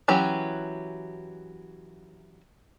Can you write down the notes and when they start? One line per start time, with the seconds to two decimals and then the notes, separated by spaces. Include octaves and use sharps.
0.08 E3 F#3 C#4 G4